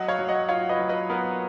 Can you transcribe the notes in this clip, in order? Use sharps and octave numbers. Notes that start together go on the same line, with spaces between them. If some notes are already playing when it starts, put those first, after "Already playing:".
Already playing: F#3 D#5 F#5
C#5 F5
F#3
D#5 F#5
F4 C#5 F5
B4 D#5
F#3
B4 D#5
B3 A#4